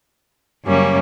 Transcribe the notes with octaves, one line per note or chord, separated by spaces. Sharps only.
F#2 C#3 G3 A#3 C#4